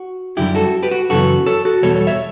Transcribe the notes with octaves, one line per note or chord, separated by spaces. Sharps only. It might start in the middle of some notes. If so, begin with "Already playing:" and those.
Already playing: F#4
F#2 D3 G3 E4 G4
F#4 A4
G4 B4
F#4
F#2 C#3 E3 B3 F#4 A4
A4 C#5
F#4 A4
E2 B2 G3 A4 C#5
A4 C#5
C#5 E5